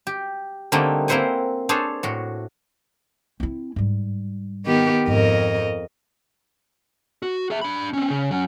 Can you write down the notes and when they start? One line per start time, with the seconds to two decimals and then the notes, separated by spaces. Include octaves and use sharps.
0.07 G4
0.72 D3 G3 A3 A#3 C4 D#4
1.08 A#3 C4 E4 C5 F#5 G#5
1.69 D4 G#4 A4 C5 C#5
2.03 A2 F#4
3.40 C4 E4
3.76 G#2 G3
4.66 D#3 B3 G4
5.08 F2 G#2 A#4 D#5
7.23 F#4
7.50 G#4 E5
7.61 D4 B5
7.93 C4 C#4
8.10 C#3
8.31 F#3 C#4